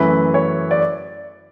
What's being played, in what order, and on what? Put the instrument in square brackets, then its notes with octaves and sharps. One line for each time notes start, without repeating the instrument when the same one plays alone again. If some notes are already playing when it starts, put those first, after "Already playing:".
Already playing: [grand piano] F#2 E3 A3 B4
C#5
D5